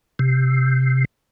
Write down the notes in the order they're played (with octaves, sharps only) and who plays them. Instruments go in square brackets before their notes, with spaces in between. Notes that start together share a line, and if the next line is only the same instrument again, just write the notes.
[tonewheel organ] C3